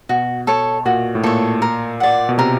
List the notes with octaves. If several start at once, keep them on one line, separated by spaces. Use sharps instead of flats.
B2 F#4
A4 C#5
A#2 F#4
A2
A#2 A4 C#5
A#4
D5 F#5
B2
C3 A#4